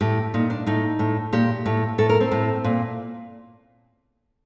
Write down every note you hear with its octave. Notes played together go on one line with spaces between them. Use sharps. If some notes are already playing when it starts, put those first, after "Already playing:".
A2 G4
A#2 D#4
D4
A2 D#4
A2
A#2 G4
A2
A2 A4
A#4
C4
A2
A#2